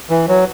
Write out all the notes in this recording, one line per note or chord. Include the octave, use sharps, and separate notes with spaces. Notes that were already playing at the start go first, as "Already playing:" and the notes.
E3
F#3